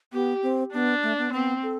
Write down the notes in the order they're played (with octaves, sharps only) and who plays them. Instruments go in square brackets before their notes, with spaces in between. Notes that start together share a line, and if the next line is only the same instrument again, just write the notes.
[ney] B3 [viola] G4
[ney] C4
[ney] B3 [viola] D4
[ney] A3
B3
[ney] B3 [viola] C4
[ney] A4